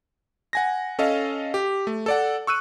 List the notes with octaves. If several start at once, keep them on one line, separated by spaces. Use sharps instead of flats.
F#5 G#5 A#6
C#4 A4 D#5 F5
G4
A3
A4 D5 F#5
C#6 E6 F#6 D#7